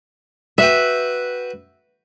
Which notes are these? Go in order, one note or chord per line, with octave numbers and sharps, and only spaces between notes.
F#4 B4 E5 G5